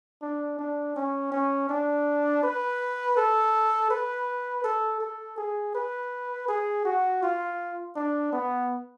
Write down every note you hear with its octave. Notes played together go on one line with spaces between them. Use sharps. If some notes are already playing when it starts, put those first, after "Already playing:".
D4
D4
C#4
C#4
D4
B4
A4
B4
A4
A4
G#4
B4
G#4
F#4
F4
D4
B3